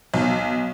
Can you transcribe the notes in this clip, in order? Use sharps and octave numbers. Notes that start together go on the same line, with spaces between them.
B1